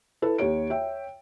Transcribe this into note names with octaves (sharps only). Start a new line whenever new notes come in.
E4 A4 B4
D#2 G4 C#5 D7
C#5 E5 G5